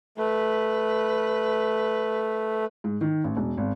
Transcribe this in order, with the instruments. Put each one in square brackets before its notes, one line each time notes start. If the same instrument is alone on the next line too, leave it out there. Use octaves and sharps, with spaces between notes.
[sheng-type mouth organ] A3 [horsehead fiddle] B4
[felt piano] G#2
D#3
A1
E1
G#1